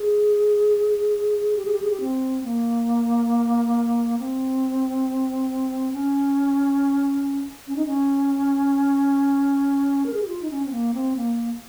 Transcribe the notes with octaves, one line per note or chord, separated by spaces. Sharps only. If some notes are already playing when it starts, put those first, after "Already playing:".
Already playing: G#4
G4
G#4
G4
G#4
G4
C4
A#3
C4
C#4
C#4
D#4
C#4
A#4
G#4
G4
F4
D#4
C#4
C4
A#3
C4
A#3